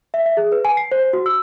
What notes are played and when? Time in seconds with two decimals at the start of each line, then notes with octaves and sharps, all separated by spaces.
0.14 E5
0.26 E5
0.37 G#4
0.52 B4
0.65 G#5
0.77 C7
0.92 C5
1.13 F#4
1.26 E6